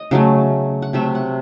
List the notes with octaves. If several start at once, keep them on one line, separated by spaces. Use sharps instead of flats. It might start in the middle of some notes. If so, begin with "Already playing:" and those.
Already playing: D#5
C#3 F#3 A3
F#5
C3 F#3 A3 E5
F#5